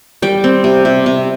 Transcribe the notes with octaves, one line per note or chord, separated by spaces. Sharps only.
G3 G5
C4
C3
C3
C3